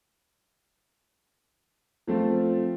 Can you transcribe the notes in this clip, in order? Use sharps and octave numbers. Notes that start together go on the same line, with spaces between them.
F3 A3 C4 F4